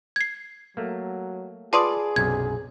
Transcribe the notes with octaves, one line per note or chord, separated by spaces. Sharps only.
G#6 C7
F#3 A3 A#3
F4 G#4 B4 D5 A5 C6 D#6
B1 F#2 C3 G#6